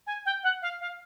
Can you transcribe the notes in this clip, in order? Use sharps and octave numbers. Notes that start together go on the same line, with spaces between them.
G#5
G5
F#5
F5
F5